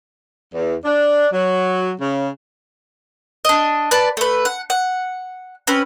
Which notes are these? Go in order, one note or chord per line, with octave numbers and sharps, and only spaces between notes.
E2
D4
F#3
C#3
D4 D#5
B4 D5 A5
A3 B4
F#5
F#5
C4 C#4 B4